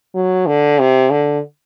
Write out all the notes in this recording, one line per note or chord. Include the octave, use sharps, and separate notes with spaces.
F#3
D3
C3
D3